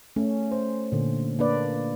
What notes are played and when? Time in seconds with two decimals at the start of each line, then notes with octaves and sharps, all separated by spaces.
0.16 A3 C#4
0.52 C5
0.92 A#2 D3
1.39 A#3 D4 B4 D5